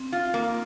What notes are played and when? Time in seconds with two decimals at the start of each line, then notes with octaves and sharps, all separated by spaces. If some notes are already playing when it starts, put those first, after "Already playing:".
Already playing: C4
0.12 F4
0.34 A#3 D#4